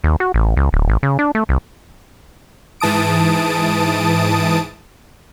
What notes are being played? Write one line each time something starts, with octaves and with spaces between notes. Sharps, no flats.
D#2
F#4
A1
C#2
D1
A1
C#3
D4
A3
C2
G#2 E3 A5 D#6 D7